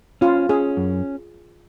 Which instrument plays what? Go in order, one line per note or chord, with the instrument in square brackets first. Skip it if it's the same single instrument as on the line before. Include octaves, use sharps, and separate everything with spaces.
[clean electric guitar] C#4 [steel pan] F4
[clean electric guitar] C#4 [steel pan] G#4
[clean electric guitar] F#2